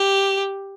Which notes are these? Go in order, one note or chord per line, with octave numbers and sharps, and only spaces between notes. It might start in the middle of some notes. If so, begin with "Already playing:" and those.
Already playing: G4